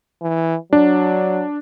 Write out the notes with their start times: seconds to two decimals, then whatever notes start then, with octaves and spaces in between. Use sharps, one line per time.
0.22 E3
0.73 F#3 D4